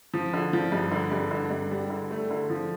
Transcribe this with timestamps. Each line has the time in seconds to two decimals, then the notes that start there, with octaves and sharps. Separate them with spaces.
0.14 F3
0.34 D3
0.53 F3
0.72 G2
0.91 D3
1.12 G2
1.31 D3
1.51 G2
1.71 G3
1.90 D3
2.11 A3
2.31 D3
2.50 F3